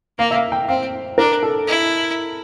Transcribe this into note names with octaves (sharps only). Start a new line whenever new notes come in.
A#3 F5
E5
F5
G5
C4 F5
D4 A#4
A4
E4